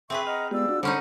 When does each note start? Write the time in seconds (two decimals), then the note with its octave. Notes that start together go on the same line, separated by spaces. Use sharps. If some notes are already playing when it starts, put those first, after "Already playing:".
0.10 C4 G#4 B4 E5 G#5 C#6
0.27 D#5 F#5 A#5 F6
0.51 G#3 B3 F4 G4 D5 E6
0.69 D4 F#4
0.83 D3 G3 C#4 D#4 C5 B5